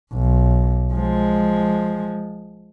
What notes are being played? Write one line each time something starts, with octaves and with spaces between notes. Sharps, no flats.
B1
F3 G#3